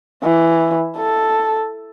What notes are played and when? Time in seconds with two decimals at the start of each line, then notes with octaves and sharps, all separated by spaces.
0.24 E3
0.97 A4